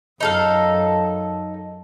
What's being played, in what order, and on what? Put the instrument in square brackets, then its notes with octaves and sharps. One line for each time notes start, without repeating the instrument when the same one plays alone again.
[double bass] F#2 [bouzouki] D#4 A4 F5